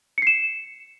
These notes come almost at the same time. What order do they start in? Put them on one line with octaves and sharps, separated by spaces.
C#7 C7 E7